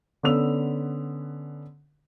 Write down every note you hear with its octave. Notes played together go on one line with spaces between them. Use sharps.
D3 B3 C#4 E6 F7